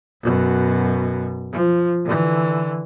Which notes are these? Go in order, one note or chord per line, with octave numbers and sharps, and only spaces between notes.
F#2 B2
F3
D3 E3